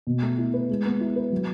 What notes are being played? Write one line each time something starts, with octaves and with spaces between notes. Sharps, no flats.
B2
A3
E4
B4
G#3
B3
E4
B4
F#3